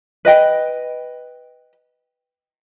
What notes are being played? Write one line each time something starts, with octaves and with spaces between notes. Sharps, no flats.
B4 D#5 G5